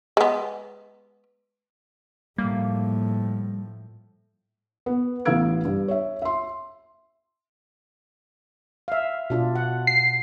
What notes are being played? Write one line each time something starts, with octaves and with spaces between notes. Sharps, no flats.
G#3 B3
A2 F3 G3 A#3
B3
A1 B3 F5 E6 G#6 D7
G2
C#5 E5
E5 C6
E5 F5
B2 D4 F4
F#5
C7